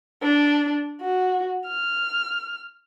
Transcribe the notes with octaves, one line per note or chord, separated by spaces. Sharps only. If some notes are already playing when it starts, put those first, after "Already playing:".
D4
F#4
F6